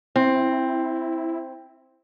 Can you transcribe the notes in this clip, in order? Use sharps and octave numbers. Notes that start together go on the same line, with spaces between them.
C4 E4